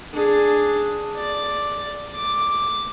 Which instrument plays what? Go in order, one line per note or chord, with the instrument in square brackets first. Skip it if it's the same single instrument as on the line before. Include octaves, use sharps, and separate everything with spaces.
[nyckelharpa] D4 G#4
D5
D6